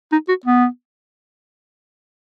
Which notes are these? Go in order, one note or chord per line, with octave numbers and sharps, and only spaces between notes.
D#4
F#4
B3